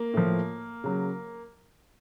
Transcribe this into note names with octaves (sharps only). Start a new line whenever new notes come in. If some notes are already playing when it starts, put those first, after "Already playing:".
Already playing: A#3
A2 F3
C#3 F#3